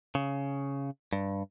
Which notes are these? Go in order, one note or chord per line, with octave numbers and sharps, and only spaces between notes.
C#3
G2